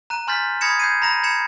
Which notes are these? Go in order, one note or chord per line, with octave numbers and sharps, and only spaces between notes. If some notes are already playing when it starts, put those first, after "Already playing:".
A#5 F#6 D#7
G#5 C6 F6 G6 A6 B6
B5 D#6 G#6 A#6 C#7 E7
G6 G#6 C7 D#7
A#5 B5 A#6 D#7 F7
B5 G#6 A#6 C#7 E7